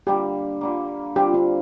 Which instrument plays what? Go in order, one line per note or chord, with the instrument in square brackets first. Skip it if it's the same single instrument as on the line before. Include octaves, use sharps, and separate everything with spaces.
[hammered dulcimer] D3 G3 A#3 [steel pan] G4
[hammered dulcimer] D3 G3 A#3
[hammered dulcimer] D3 G3 C4 F4 [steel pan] G4
[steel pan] D4